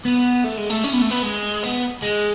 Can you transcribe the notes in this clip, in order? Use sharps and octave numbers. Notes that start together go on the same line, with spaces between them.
B3
A3
G#3
A3
C#4
B3
A3
B3
G#3
B3
G#3